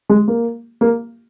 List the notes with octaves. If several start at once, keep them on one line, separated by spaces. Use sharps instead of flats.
G#3
A#3
A#3